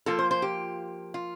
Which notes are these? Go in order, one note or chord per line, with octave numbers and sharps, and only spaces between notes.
F3 A#3 F4 A4
C5
C5
G4
F4